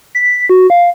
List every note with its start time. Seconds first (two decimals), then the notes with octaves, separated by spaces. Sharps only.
0.15 B6
0.49 F#4
0.70 F5